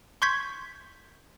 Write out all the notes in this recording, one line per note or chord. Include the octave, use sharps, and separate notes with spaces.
C6 C#6 G6 G#6 B6